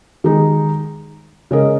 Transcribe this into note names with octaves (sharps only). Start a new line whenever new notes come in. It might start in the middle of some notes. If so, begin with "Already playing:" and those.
D#3 G#3 D#4 G#4
C#3 G#3 C#4 A#4 D#5